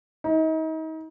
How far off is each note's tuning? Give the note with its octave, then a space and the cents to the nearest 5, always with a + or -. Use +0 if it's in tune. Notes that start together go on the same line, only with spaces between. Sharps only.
D#4 +35